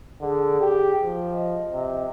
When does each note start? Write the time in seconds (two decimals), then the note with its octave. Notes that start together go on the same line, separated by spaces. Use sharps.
0.21 D3 G#4
0.60 G4
1.03 F3
1.33 D#5
1.72 C3